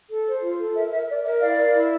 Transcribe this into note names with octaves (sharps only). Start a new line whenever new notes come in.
A4
C5
F4
A4
A#4 E5
A#4 E5
A#4 D5
A#4 E5
E4 D5 F5
A#4
E4